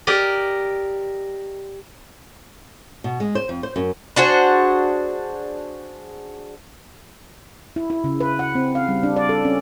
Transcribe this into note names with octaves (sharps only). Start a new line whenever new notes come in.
G4 A#4 D5 D#5
B2
G#3
C5
F2
C5
F#2
D4 F#4 G#4 C5
E4
E4
C#3
B4
F#5
C4
F5
G3
D4
D5
A4
C#4